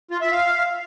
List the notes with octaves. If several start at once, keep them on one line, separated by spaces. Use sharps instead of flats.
F4
E5
F5